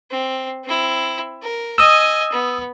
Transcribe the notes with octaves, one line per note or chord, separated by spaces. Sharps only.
C4
C4 E4
A#4
D#5 G#5 D#6 E6
B3